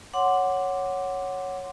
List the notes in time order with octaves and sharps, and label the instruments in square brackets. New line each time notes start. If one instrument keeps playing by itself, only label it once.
[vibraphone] C#5 F#5 C6 D6